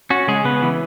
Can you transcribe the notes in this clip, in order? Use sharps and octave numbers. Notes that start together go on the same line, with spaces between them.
C#4 F#4
C#3 G#3 G#4
C#3 B3 B4
E3